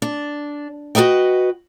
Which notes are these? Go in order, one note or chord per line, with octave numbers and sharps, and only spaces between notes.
D4
F#4 A#4 B4 D#5 G5